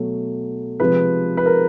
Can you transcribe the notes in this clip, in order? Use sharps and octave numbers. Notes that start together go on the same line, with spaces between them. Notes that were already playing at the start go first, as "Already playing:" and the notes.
Already playing: B2 F#3 A3
C3 F3 G#3 B4
B4
A#4